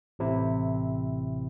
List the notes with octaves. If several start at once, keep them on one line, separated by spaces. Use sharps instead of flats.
A1 C3 E4